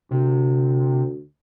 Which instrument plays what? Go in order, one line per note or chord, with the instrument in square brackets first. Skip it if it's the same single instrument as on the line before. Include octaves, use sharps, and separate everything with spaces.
[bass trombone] D2 [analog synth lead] C3